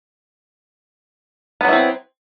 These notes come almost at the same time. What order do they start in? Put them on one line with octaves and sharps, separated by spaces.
B3 F#3 E4 C4